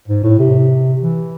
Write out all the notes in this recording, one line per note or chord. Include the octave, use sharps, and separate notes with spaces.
G#2
A2
C3
E3